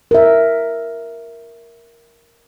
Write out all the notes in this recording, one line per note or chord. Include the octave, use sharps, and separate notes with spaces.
A#4 E5